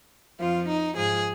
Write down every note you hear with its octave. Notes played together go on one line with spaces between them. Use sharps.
F2 F3 F4
D#4
G#2 F3 G#4